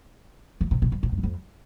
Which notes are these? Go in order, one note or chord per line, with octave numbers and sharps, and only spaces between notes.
E3
C3
B2
G2
A2
G2
E2
F2